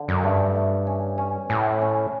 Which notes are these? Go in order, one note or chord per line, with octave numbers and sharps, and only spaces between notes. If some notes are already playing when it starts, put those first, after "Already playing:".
Already playing: D3
F#2
G2 A3
A3
C#4
C#4
A2 C#4
C#4